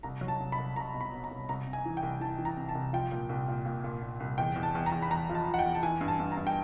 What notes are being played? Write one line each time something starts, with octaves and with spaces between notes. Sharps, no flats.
C2 A#5
F#3
A5
C2
B5
C2
C2 A#5
B2
B5
B2
A#5
C2
C2 A#5
C3
G#5
E3
G5
C2
E3 A5
E3
A#5
C3
A5
C2
F3 G5
A#2
C2
A#2
A#2
A#2
A#2
C2
E2 G5
E2
A5
E2
A#5
E2
B5
E2 A#5
F3
A5
F3
F#5
G5
E2
A5
E3 G#5
G2
A5
G2
A#5
G2
G5